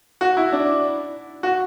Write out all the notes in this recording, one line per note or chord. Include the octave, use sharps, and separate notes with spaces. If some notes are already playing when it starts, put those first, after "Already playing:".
F#4
E4
D4
F#4